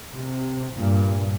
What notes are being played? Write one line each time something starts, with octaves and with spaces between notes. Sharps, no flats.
C3
G2 A#2